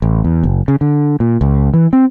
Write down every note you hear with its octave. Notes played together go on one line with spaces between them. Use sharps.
A1
E2
F#1
C#3
D3
A#2
C#2
E3
C4